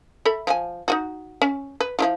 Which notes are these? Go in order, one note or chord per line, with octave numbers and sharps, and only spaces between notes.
A4 E5 B5
F3 G#5
D#4 F4 F#4
C#4
B4
F3 E4 F4